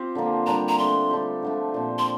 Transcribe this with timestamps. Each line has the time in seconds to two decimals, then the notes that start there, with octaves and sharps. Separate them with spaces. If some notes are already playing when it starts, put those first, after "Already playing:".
Already playing: C4 F4 G4
0.15 D3 F3 A#3 D4
0.47 G3 D4 G4 A#4 A#5
0.68 A#5
0.79 A3 D4 A4 C6
1.11 G3 D4 G4
1.43 D3 F3 A3
1.74 A#2 F3 C4
1.99 C6